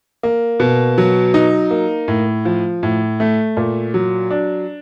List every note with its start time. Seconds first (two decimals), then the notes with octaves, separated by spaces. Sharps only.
0.23 A#3
0.60 B2
0.98 F#3
1.34 D#4
1.71 A#3
2.08 A2
2.45 F3
2.83 A2
3.20 A3
3.57 A#2
3.94 F#3
4.30 D4